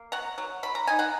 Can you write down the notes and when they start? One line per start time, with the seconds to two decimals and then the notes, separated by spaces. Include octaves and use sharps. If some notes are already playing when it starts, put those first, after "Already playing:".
Already playing: A#3
0.12 F#3 F#5 A#5
0.38 F#3
0.63 F#3 B5
0.75 A#5
0.87 D#4 G#5
0.99 F#5 A#5